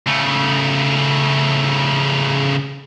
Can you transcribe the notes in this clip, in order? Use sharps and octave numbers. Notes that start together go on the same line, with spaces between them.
C#3 A3